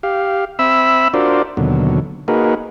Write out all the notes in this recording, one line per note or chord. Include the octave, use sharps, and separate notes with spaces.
G4 F5
C4 E5 B5 E6
D4 F4 F#4 A#4 C5 D5
D#2 B2 D3 F#3
A#3 D#4 F#4 G#4 A#4 B4